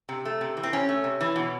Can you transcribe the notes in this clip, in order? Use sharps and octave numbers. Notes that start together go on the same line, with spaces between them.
C3
A3
C3
E3
C4
C3 C#4
A3
C3
E3
B2